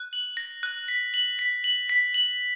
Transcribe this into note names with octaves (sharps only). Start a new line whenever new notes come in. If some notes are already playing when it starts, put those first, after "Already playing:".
Already playing: F#6
F#7
A#6
F#6
B6
F#7
B6
F#7
B6
F#7